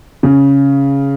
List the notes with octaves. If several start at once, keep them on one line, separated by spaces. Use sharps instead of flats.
C#3